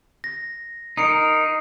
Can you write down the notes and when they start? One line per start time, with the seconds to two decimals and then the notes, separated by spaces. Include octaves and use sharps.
0.24 A#6
0.97 D#4 A#4 D#6 C7 C#7